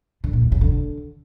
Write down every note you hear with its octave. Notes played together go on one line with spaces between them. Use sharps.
D3
A#2
E2
C#3
D3